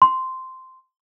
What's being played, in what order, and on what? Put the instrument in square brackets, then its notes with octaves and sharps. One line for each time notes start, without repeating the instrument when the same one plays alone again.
[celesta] C6